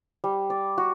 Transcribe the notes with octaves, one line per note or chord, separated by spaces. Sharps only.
G3
D5
F#4